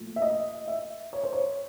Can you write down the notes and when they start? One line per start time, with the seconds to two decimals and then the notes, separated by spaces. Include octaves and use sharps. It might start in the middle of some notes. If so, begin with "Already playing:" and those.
Already playing: A#2 F3 A3
0.16 E5
0.22 D#5
0.68 E5
1.13 C#5
1.23 C5
1.33 C#5